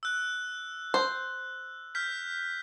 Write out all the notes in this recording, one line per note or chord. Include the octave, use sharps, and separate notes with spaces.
E6 F#6
C5
F6 G6 B6